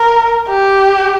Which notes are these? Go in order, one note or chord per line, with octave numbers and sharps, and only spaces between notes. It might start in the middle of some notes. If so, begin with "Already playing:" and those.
Already playing: A#4
G4